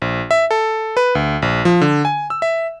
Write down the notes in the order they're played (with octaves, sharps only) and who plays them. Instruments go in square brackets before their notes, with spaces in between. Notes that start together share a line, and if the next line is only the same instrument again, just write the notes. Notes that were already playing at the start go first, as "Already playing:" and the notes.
[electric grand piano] A#1
E5
A4
B4
D2
A#1
F3
D3
G#5
E6
E5